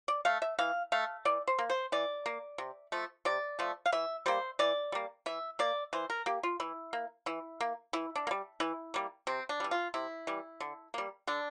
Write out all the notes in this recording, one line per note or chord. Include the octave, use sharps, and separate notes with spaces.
D5
A3 F5
E5
E3 F5
A3 F5
E3 D5
C5
A#3
C5
E3 D5
A#3
C3
F3 A3
C3 D5
F3 A3
F5
E3 E5
G3 A#3 C5
E3 D5
G3 A#3
E3 E5
A#3 D5
E3 C5
A#4
A#3 G4
F4
E3 E4
A#3
E3 E4
A#3
E3 E4
D4
A#3
G3
E3 E4
G3 A#3
C3 C4
D4
E3 G3
F4
C3 E4
E3 G3
D3
G3 A#3
D3 D4